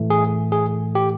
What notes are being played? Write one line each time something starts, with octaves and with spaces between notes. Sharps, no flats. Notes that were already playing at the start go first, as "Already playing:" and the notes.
Already playing: A2 E3 A3
G#4
G#4
G4